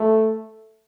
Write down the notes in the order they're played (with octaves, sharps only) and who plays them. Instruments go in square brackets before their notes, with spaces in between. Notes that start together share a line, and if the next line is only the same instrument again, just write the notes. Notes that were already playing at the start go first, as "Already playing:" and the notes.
Already playing: [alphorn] A3